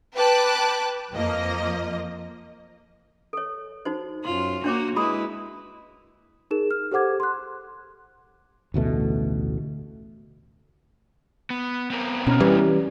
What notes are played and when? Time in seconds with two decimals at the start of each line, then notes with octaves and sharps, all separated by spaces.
0.16 B4 G5 A5 D6 F#6
1.13 F2 F3 A#3 D#5
3.33 A4 C#5
3.85 D#4 F#4 C5
4.25 F#2 F4 C6
4.64 A#3 D4 F#4 C#5 D6
4.96 G#3 E4 F#4 B4 B5 D#6
6.51 D#4 G#4 A#4 E7
6.71 F6
6.92 G4 A4 C5 F#5 D6 G#6
7.20 C6 F#6
8.74 A1 D2 B2 A3
11.50 B3
11.90 B3 C4 A#4
12.27 B2 C#4 A#5 F6
12.40 E3 G3